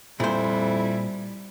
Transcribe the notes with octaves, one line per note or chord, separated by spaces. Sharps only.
F2 A#2 G3 E4 C5